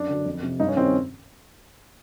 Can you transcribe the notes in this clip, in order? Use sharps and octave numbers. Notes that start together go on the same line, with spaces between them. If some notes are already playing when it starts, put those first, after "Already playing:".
Already playing: F#2 D4
D3 F#3
F2
C3 F3
G2 D#4
C#4
D#3 G3 C4 C#4